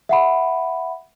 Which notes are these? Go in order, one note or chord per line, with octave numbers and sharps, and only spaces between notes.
E5 F#5 B5